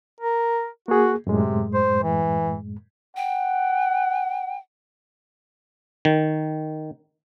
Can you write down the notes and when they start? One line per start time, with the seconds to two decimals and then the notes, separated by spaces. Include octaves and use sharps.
0.21 A#4
0.88 A#3 F#4 G#4
1.27 F#2 A2 C3 G#3
1.74 C5
2.02 E3
3.17 F#5 G5
6.05 D#3